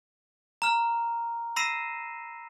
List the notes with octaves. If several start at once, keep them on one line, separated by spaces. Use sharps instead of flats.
A#5 F6
B5 E6 A#6 C7 D#7 E7